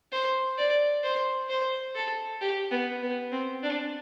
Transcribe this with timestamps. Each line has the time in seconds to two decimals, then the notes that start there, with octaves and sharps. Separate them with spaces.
0.12 C5
0.58 D5
1.04 C5
1.49 C5
1.95 A4
2.41 G4
2.71 B3
3.02 B3
3.32 C4
3.63 D4